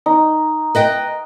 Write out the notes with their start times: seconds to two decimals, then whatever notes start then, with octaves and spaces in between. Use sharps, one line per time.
0.06 D#4
0.75 B4 D#5 G5